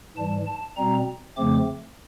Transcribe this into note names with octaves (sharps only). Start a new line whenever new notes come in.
G#2 E3 G3 A5
A5
B2 G3 C4 A#5
F2 C#3 F3 A3 C4 D6